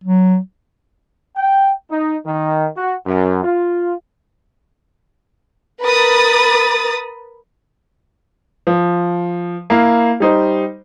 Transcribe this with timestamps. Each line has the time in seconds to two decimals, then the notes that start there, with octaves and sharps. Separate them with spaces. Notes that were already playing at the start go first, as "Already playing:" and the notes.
0.04 F#3
1.37 G5
1.91 D#4
2.27 D#3
2.77 F#4
3.07 F#2
3.44 F4
5.83 A#4 B4 B5 D#6 A6
8.67 F3
9.70 A#3 E4 F5
10.20 G3 D#4 C5